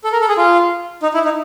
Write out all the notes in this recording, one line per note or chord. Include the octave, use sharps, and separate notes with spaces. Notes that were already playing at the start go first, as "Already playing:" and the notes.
A4
A#4
A4
G#4
F4
D#4
E4
D#4